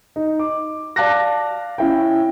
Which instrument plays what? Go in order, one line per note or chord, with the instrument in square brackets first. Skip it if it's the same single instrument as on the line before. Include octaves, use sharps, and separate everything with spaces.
[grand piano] D#4
D6
D5 F5 A5 D6 F#6 A#6
C#4 E4 G5